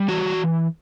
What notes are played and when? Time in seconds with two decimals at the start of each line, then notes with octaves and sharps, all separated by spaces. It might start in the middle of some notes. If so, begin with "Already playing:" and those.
Already playing: G3
0.08 E3 F#4
0.25 E3